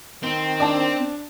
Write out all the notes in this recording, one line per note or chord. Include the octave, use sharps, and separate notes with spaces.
D#3 C4
D4 A5